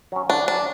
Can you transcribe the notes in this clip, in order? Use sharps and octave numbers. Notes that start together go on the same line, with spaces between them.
F#3 C#4
D3 D4
F#3 C#4 D4